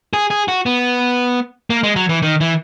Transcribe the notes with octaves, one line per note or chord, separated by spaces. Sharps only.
G#4
G#4
F#4
B3
A#3
G#3
F#3
E3
D#3
E3